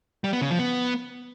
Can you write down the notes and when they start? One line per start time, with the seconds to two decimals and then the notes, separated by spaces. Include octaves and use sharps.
0.24 G3
0.33 B3
0.41 C#3
0.50 F3
0.59 B3